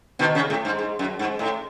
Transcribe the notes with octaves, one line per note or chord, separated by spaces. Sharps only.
B2 D#3
C#3
A2
G#2
G#2
F#2
G#2
A2